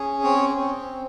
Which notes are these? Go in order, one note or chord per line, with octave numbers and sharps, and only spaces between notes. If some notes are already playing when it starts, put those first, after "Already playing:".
Already playing: C#4 G#4
C4 C#5
C4